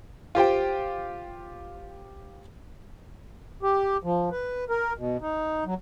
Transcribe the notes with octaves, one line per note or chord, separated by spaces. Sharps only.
F4 G4 C5 G5
G4
F3
B4
A#4
B2
D#4
F#3